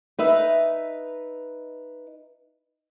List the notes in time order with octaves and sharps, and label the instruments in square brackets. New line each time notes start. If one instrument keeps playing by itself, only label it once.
[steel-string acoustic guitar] D#4 B4 E5